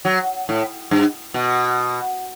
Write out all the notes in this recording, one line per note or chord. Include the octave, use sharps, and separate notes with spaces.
F#3
A2
G2
B2